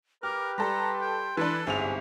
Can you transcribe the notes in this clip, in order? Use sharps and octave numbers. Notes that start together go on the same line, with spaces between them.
G4 A#4 B4 D6 F6
G3 A4 A#5 C6
G5
E3 D4 A4 B4
G1 C2 G#2 C3 G#3 G#5 F7